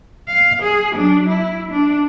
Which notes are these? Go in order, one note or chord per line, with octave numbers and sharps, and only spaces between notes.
F5
G#4
F#3 D4
E4
D4